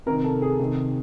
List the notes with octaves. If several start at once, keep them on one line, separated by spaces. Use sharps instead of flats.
C3 D#3 A#4
A4
G#4
C3 D#3